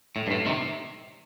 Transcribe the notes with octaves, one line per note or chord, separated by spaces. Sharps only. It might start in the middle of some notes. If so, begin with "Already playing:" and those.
A2
G2
A2
C3 D#3